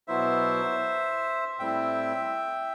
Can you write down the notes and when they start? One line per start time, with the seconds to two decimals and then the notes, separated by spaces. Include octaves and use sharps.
0.08 B2 F#3 B3 E4 C5 E5
1.59 A2 G3 C4 E4 E5 G5